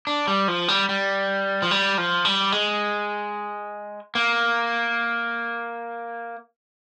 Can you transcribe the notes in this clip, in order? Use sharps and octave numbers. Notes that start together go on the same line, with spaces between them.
D4
G3
F3
G3
G3
F3
G3
F3
G3
G#3
A#3